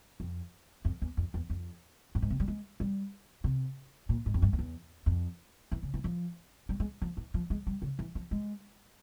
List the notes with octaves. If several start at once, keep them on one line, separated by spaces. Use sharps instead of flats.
F2
F2
E2
F2
E2
F2
G2
G#2
C3
G3
G#3
G3
C3
A#2
G#2
F2
G2
F2
E2
F2
E3
C#3
E3
F3
G3
G#3
F3
E3
F3
G#3
G3
C#3
E3
F3
G#3